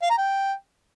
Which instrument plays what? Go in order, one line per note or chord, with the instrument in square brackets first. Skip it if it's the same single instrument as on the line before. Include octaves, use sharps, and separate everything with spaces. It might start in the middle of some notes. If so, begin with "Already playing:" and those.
[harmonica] F5
A#5
G5